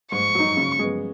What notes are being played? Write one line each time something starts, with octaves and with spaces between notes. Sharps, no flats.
G#2 C#6
F#3 D#4
C#3
G#3 B3